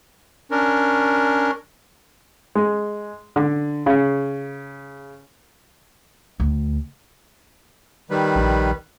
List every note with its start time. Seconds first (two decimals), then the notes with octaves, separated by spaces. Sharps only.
0.51 C#4 D4 A#4
2.55 G#3
3.36 D3
3.86 C#3
6.40 D2
8.10 D#3 G3 B4
8.35 A#1